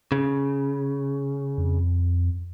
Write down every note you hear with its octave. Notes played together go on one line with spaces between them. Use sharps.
C#3
F2